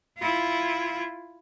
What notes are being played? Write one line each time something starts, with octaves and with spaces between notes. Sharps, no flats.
E4 F4